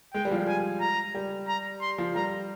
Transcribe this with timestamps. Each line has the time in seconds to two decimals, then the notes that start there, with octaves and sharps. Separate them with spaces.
0.14 G#3 G5
0.25 G3
0.31 F3
0.36 G3
0.48 G#5
0.81 A#5
1.15 G3
1.48 A#5
1.81 C6
1.98 F3
2.15 G3 A#5